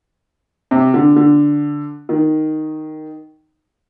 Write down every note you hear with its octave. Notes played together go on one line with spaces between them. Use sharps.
C3
D3
D3
D#3